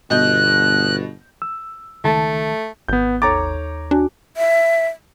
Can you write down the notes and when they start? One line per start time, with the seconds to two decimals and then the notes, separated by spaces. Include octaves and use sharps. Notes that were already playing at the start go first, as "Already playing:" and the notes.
0.10 G1 B2 D#5 F#6 G6
1.42 E6
2.04 C#2 D#3 A3 A5
2.89 G#1 B3 G6
3.22 D#2 A4 C#5 A#5 D6 A6
3.91 D4 F#4 G#5 A5
4.37 E5